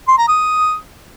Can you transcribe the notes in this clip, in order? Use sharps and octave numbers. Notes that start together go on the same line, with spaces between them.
C6
A#5
D#6